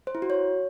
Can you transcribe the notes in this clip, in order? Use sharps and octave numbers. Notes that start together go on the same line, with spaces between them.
C5
E4
F#4
C#5